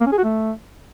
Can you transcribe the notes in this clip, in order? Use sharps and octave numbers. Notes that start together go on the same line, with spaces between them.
A#3
C#4
G#4
F#4
A3